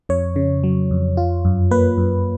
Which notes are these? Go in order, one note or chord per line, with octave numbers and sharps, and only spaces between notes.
F2 C#5
C#3
F#3
F2
F4
F#2
A#3 B4
F#2